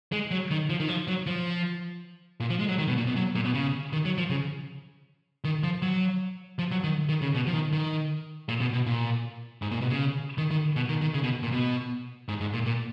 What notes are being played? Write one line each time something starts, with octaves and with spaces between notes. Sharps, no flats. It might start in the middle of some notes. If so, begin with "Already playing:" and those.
G#3
F#3
D#3
F3
D#3
F3
F#3
F3
A#2
F3
G#3
F#3
D#3
B2
A#2
B2
F#3
A#2
B2
C#3
D#3
F#3
F3
C#3
D#3
F3
F#3
F3
F#3
D#3
D#3
C#3
B2
F3
D#3
D#3
A#2
B2
B2
A#2
G#2
A#2
B2
C#3
D#3
D#3
B2
D#3
D#3
C#3
B2
A#2
B2
G#2
G#2
A#2
A#2